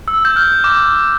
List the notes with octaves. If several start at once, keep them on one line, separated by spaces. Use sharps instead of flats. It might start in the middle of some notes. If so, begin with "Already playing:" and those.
E6
G6
F6
D6